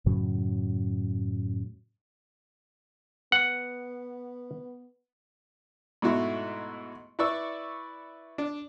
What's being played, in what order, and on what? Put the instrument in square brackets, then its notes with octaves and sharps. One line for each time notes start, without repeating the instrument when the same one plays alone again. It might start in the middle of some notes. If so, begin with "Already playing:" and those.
[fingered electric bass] F#2 A2 C#3 F#3
[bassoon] B3 [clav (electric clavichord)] F#5
[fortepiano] G#2 B2 A3 E4 F#4
E4 B4 D5 C#6 E6
D4